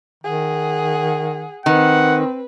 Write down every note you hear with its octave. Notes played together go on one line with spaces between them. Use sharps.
D#3 G#4 F#5
D#3 C4 B4 F#5